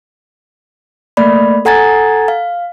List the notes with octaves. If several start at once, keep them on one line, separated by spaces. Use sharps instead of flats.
A3 A#3 D5 B5
A4 F#5 G#5 A#5 G#6 A6
F5